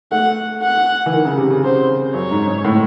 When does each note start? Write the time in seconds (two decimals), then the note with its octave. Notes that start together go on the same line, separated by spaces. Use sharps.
0.11 A3 F#5
0.62 F#5
1.06 E3
1.13 D#3
1.25 C#3
1.38 C3
1.50 C#3
1.64 C3 C5
2.14 F#2 C#5
2.31 G#2
2.48 G#2
2.65 A2